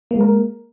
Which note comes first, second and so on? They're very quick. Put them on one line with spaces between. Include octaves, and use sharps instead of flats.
A#3 G#3 A#4